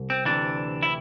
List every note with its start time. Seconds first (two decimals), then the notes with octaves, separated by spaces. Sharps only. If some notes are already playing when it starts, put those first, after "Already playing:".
Already playing: C2
0.10 C4
0.25 D2 C3 E3 D4
0.83 E4